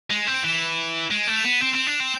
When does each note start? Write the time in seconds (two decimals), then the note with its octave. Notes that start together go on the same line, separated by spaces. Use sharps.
0.10 G#3 F7
0.22 C4 E7
0.34 D7
0.43 E3 E7
1.11 G#3 D7
1.23 D7
1.28 A3 E7
1.36 F7
1.45 B3 E7
1.61 C4 E7
1.74 C4 E7
1.87 D4 F7
2.00 C4 E7